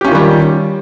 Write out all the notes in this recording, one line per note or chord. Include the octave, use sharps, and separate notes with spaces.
D#3 G3 C#4 F4 G4